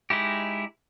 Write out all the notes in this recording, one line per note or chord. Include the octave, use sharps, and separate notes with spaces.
G#3 D#4 E4 G4